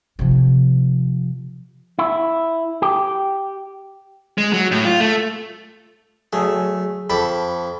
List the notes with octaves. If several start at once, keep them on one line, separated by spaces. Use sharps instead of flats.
C3 F3
E4
G4
G#3
F#3
A2
F4
A3
F#3 A3 G#4 E6
F2 A4 B5 D6